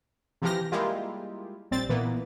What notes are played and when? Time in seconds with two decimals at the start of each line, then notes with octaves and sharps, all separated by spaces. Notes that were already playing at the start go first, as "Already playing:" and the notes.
0.42 C3 E3 F3 G4 F6 A#6
0.72 G3 G#3 A#3 E4 F4 G4
1.71 A#1 G3 C4 A6
1.89 A#2 E3 A#3 B3